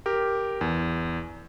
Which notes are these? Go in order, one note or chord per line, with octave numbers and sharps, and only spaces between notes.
G4 A#4
E2